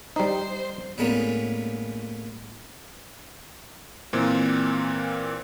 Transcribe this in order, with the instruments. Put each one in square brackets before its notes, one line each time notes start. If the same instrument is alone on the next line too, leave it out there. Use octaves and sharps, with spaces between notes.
[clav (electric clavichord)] G3 D#4 [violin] C5
[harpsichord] A2 G3 G#3 A#3 B3 C#4
[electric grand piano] A#2 E3 A#3 C4